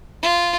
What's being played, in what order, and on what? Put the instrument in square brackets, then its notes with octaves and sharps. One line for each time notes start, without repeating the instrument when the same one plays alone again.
[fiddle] F4